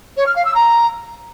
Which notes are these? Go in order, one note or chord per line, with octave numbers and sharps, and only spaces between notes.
C#5
F6
F5
E6
A#5